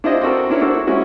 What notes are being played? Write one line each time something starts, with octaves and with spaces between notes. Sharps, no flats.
D4 E4 F4 G4 C5 D#5
C4 D4 F#4 A4 A#4
C#4 D4 E4 A#4 C#5
D4 F#4 A4 A#4 C5
E4
G#3 A#3 C#4 E4 F#4